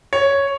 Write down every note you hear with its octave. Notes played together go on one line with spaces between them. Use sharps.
C#5